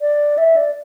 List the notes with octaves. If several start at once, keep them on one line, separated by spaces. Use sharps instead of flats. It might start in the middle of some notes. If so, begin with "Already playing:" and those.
D5
E5
D5